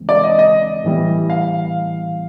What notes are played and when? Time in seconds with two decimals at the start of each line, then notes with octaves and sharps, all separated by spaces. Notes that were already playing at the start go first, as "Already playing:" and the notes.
Already playing: D#2 C#3 E3 G#3 C4
0.09 D5
0.24 D#5
0.39 D#5
0.84 A2 E3 G3 B3
1.30 F5